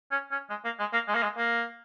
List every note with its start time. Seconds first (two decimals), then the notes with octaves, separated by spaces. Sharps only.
0.12 C#4
0.31 C#4
0.50 G#3
0.65 A#3
0.80 G#3
0.93 A#3
1.08 G#3
1.15 A#3
1.23 G#3
1.37 A#3